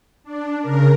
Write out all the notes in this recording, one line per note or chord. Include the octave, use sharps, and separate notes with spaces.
D4
C#3 A#4